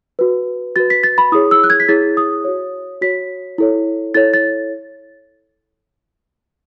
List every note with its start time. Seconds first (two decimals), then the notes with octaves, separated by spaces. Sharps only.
0.19 F#4 B4
0.76 F#4 B4 A6
0.90 B6
1.03 A6
1.18 B5
1.32 E4 G#4 C#5 D#6
1.51 E6
1.64 F#6
1.70 G#6
1.80 B6
1.88 E4 G#4 C#5 A6
2.17 D#6
2.44 F#4 C#5
3.01 F#4 C#5 B6
3.58 E4 A4 C#5
4.14 E4 A4 C#5 A6
4.34 A6